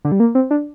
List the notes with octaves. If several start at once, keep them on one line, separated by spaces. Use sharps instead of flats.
D3
G3
A#3
C4
D4